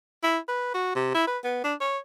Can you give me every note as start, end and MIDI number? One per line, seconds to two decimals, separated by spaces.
0.23 0.38 64
0.48 0.71 71
0.74 0.94 66
0.95 1.13 48
1.14 1.24 64
1.27 1.38 71
1.44 1.64 59
1.64 1.74 62
1.81 1.98 73